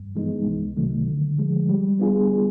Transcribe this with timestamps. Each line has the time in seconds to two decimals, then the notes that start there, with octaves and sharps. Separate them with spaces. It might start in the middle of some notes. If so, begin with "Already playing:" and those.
Already playing: G2
0.16 E3 G#3 B3 D#4
0.46 C2
0.76 C3 D#3 F#3 A3
1.08 D3
1.38 F3 G#3
1.69 G3
1.99 B3 D4 F4 G#4